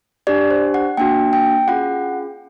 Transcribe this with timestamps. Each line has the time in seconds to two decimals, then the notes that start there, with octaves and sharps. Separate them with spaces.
0.27 D4 G4 D5
0.51 C5
0.74 F#5
0.97 A#3 D4 F#4 G5
1.33 G5
1.68 C#4 F4 G#4 F#5